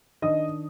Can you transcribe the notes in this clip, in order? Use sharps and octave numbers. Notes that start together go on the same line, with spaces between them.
D#3 D4 D#5 D#6